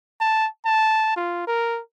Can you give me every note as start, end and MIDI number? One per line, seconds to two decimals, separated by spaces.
0.20 0.47 81
0.65 1.14 81
1.16 1.44 65
1.47 1.80 70